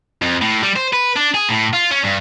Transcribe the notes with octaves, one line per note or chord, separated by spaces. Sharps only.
F2
A2
G3
C5
B4
D4
G#4
A2
F4
C#4
G2